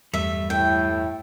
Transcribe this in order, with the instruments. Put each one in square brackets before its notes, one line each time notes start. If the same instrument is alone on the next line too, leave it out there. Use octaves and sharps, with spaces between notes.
[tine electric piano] E2 G2 [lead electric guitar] G3 A3 [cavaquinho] E5
[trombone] A2 [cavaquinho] G5